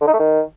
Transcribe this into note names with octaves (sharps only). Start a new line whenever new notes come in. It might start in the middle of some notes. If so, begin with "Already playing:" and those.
D3
D#4
A3
D#3